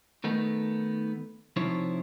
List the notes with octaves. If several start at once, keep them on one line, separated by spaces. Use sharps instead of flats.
D#3 A3 B3 D#4
C3 F3 D#4 E4 C5 C#5